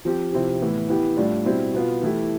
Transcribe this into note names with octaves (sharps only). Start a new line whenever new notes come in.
F3 C4 G4
C3 F3 C4 E4 G4
A2 E3 B3 E4
E3 B3 E4 G4
A2 G3 D4 F4
B2 G3 C4 E4
B2 B3 F4
E3 A3 E4 G4